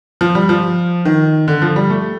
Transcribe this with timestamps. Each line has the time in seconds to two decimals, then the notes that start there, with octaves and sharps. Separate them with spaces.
0.21 F3
0.35 G3
0.49 F3
1.05 D#3
1.48 D3
1.62 F3
1.76 G3
1.90 A3